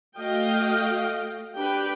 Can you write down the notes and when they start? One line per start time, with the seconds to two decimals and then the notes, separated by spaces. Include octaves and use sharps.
0.18 A3 F#4 D#5 F5 G5
1.57 D4 G4 B4 G5